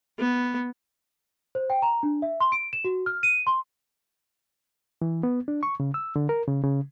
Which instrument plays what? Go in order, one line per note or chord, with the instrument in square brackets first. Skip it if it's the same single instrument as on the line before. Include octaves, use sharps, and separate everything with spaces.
[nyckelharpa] B3
[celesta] C5
G5
A#5
D4
E5
C6
D7
E7
F#4
F6
D#7
C6
[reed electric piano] E3
B3
D4
C#6
C#3
E6
D3
A#4
C#3
C#3